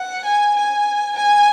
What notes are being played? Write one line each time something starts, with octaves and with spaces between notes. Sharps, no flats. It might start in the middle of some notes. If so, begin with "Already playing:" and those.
Already playing: F#5
G#5
G#5
G#5